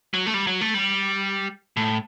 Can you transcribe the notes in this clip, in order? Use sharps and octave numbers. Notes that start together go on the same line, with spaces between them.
F#3
A3
G3
F#3
A3
G3
A2